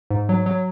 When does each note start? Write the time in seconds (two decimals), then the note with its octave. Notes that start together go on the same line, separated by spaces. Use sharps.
0.10 G#2
0.29 F#3
0.46 F#3